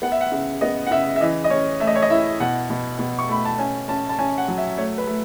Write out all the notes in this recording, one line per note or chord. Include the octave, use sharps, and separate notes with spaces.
B3 F#5
E5
F#5
C#3 E5
B3 D#5
F#5
C#3 E5
E5
E3 D#5
D#5
C#4 C#5
A3 E5
D#5
C#5
D#5
E4 E5
B2 F#5
B2
B2
C#6
A3 B5
A5
C#4 G#5
C#4 A5
A5
C#4 G#5
F#5
F#3
E5
A3 C#5
B4
A3